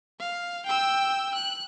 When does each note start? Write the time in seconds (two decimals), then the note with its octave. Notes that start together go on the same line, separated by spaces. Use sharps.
0.19 F5
0.65 G5 E6
1.34 F#6